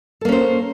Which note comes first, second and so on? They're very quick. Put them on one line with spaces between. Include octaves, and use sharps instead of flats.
A4 A#3 C#4 C5